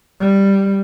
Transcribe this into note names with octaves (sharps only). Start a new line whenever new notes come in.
G3